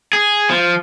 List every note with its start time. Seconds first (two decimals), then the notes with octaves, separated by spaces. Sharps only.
0.13 G#4
0.50 F3